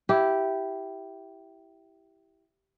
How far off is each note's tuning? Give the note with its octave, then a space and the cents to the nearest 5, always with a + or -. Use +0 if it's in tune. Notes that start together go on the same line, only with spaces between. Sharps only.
E4 +0 G4 -10